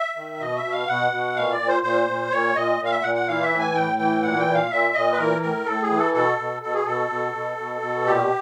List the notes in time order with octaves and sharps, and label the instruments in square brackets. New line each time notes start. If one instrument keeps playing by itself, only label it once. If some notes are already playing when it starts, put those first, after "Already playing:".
Already playing: [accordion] E5
D#3
B2 D#5
E5
B2
F5
B2 F#5
B2
A#2 F5
D5
A#2
C5
A#2 C5
A#2
A#2 C#5
A#2 D#5
A#2
F5
E5
A#2 F#5
F#5
E3 F5
E5
A2
G#5
A2 G5
E3 G5
A#2 F#5
G5
A#2
F5
A#2 E5
A#2 D#5
B4
E3 A#4
A2 A#4
A2 A4
G#4
E3
A4
B2 A4
B2
B2 A4
G#4
B2 A4
B2
B2
B2
B2
A#2 G4